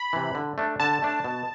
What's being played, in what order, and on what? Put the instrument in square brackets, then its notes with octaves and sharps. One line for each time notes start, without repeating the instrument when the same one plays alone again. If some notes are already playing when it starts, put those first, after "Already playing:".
Already playing: [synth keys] B5
[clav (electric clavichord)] C3 E3
D3
A3 D4
[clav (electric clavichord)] D3 [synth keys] A5
[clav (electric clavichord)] A3 D4
B2